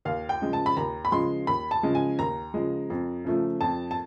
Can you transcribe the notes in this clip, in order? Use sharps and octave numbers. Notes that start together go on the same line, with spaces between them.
D#2 F5
G5
C#3 F3 G#3
A5
B5
D#2 A#5
B5
C#3 F3 G#3 C6
D#2 B5
A5
C#3 F3 G#3
G#5
D#2 A#5
C#3 F3 G#3
F2
C#3 F3 A3
F2 A5
A5